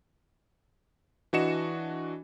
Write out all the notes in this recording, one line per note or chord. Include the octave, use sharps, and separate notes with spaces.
E3 D4 F#4 D#5 C#7 E7